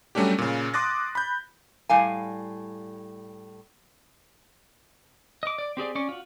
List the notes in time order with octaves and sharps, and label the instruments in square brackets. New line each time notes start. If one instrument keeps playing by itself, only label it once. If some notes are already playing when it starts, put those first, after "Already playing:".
[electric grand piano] F#3 G3 A3 C#4 D4 G4
A#2 C#3
C6 D6 D#6 F#6 A6 A#6
B5 G6
[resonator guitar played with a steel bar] A2 G3 F5 G#5
[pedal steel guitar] D#5 D6
D5
C4 G4 G#4 D5
C#4 D5 C#6
F4 F#4